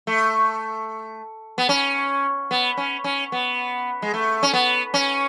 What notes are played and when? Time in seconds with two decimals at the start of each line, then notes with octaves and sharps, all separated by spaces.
0.07 A3
1.58 B3
1.69 C#4
2.51 B3
2.77 C#4
3.04 C#4
3.32 B3
4.02 G#3
4.14 A3
4.43 C#4
4.53 B3
4.94 C#4